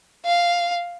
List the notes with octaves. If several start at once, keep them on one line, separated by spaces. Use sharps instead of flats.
F5